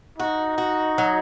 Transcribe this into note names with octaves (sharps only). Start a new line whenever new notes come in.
D#4 F#4
F#4
F#3